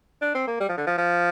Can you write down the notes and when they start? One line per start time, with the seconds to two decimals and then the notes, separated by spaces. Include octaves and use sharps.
0.22 D4
0.35 C4
0.47 A#3
0.60 G3
0.69 F3
0.77 D3
0.87 F3
0.98 F3